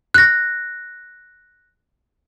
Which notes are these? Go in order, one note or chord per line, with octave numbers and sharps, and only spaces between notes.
F#6 A#6